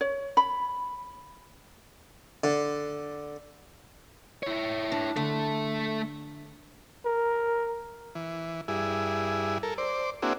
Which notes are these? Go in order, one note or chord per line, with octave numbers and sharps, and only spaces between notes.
C#5
B5
D3
E4 C#5
D4
D3 A3 A4
A#4
E3
G2 E4 G#4
A4 A#4
C5 D5
A#3 C4 D4 E4 F#4 G#4